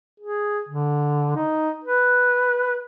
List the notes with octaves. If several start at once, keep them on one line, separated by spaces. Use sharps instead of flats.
G#4
D3
D#4
B4